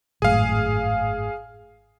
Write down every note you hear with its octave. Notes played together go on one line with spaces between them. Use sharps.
G#1 F#2 A2 G#4 F5